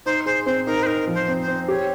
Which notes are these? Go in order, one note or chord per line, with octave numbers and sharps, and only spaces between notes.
D#4 C5
G#4 C5
C4 C5
D#4 A#4
C5
D#4 A#4
F3
C5
C4
C5
C4
G4 C#5